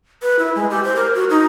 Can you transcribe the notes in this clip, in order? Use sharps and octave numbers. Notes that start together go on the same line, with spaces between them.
B4
E4
G#3
G4
C5
A#4
F#4
D#4